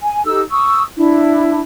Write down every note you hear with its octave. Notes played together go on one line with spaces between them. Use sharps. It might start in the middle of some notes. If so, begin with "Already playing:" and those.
G#5
D#4 G4 A4 E6
C#6 D#6 E6
D4 E4